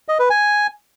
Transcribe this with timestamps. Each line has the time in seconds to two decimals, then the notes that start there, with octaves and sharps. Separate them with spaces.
0.08 D#5
0.19 B4
0.30 G#5